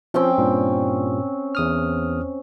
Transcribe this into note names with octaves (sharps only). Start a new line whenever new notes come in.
F3 C4 C#4 G5
G2 A#2
E2 D#6 F6